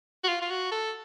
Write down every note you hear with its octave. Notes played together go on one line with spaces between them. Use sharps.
F#4
F4
F4
F#4
A4